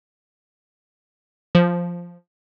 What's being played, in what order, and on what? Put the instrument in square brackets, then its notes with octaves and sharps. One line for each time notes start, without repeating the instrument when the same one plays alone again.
[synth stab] F3